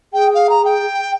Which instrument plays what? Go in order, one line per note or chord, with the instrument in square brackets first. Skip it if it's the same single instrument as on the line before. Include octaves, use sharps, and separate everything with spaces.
[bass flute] G#4 [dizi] G5
[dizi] F5
A#5
G5